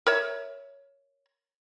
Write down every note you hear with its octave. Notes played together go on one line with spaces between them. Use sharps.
A#4 C#5 E5